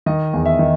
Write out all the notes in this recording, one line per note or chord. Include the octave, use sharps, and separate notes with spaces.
D#3 D#5
E2
E5
D#3